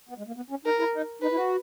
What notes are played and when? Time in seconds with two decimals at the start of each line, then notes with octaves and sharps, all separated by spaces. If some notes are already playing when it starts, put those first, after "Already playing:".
0.09 B3
0.18 G#3
0.27 A#3
0.36 B3
0.50 C#4
0.65 D#4 A#4
0.79 E4
0.94 D#4
1.21 D#4 B4
1.31 E4
1.35 F#4